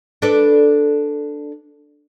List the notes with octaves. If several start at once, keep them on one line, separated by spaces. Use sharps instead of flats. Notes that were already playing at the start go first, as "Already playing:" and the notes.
D4 A4 B4